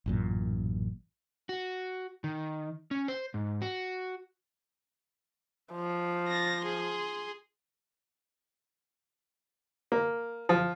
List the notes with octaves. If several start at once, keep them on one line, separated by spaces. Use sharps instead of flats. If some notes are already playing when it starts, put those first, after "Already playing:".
A1 F#2 A#2
F#4
D#3
C#4
C5
G#2
F#4
F3
A6 A#6
G#4 C6
A#3
F3